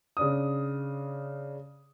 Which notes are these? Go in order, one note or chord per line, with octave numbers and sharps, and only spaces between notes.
C#3 D4 D#6